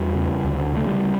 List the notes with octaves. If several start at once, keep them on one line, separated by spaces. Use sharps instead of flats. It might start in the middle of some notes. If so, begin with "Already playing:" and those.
Already playing: E2 G3
C#3
D2
C#3 A3
G3